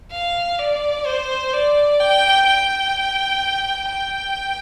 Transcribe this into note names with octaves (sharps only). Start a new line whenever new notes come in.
F5
D5
C5
D5
G5
G5
G5